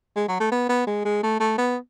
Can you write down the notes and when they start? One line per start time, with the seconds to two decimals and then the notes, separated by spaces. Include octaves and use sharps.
0.16 G#3
0.28 F#3
0.40 A3
0.51 B3
0.69 B3
0.87 G#3
1.05 G#3
1.23 A3
1.40 A3
1.58 B3